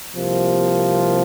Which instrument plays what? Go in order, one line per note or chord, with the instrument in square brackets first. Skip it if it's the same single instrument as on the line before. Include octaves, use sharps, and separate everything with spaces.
[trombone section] C2 C3 F3 A#3